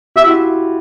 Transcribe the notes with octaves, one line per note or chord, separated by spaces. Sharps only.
F4 G4 E5
E4 F#4